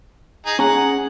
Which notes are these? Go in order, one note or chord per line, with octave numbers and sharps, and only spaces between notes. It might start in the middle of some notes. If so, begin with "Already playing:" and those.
D#4 G#4
C#4 G#4 F#5 A#5